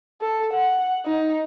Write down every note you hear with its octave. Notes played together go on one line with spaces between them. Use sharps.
A4
F#5
D#4